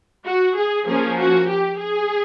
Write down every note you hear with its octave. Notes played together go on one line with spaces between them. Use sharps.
F#4
G#4
F3 A#3 C#4 G#4
F#4
G4
G#4